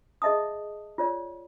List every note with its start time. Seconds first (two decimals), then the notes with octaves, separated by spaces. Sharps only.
0.22 G#4 D#5 E5 A5 D#6
0.98 F4 C#5 D5